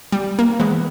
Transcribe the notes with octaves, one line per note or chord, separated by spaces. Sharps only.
G3
A#3
E3 G#3 B3